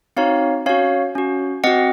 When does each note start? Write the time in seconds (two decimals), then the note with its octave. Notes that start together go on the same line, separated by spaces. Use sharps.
0.17 C4 D#4 F#4 C#5 F5
0.66 C#4 F#4 C#5 F5
1.15 C#4 F#4
1.64 C4 F#4 D#5 F#5